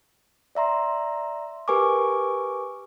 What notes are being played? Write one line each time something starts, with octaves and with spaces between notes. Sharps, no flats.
D5 E5 A#5 C6
G4 A#4 B4 G#5 C#6 D6